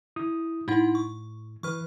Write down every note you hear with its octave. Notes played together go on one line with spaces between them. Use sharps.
E4 D#6
A2 D#4 E4 F#5
C#6
E3 B4 C#6 F6